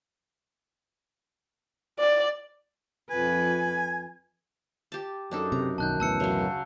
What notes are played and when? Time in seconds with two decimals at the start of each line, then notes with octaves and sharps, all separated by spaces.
1.99 D5
3.10 F2 F3 B4 G#5
4.92 G4 A5
5.31 F#2 D4 D#4 A4
5.52 C3 A#5
5.78 B1 D#3 A5 F#6 G6
6.00 D2 B2 E3 A5 E6 C#7
6.20 F#2 C#3 F#3